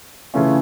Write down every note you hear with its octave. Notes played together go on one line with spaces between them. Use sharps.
C#3 E3 A3 C#4 F4